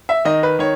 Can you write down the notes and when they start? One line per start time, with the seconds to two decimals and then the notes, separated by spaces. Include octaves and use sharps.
0.09 E5
0.25 D#3 D#5
0.43 B4
0.59 D#3 C#5